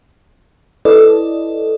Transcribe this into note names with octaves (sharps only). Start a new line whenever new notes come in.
E4 A4 B4 D5 D#5